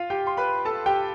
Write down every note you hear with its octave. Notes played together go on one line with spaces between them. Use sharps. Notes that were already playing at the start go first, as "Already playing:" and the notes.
Already playing: F4 F5
G4 G5
C6
B4 B5
A4 A5
G4 G5